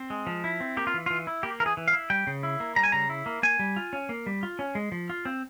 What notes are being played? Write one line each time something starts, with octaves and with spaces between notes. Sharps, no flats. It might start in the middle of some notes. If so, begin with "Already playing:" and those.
Already playing: C4
G#3
F3
E4
C4
A#3 G4
F4
E3
E3 F4
E4
A#3 G4
E3 A#4
G#4
E3
F5
E4
G3 G5
C#3
E4
A#3
G3 A#5
G#5
C#3 A#5
E4
A#3
A#3 G#5
G3
F4
C#4
A#3
G3
F4
C#4
G#3
F3
F4
C4